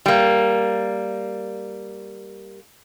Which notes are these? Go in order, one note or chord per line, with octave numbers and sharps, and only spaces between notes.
G3 A#3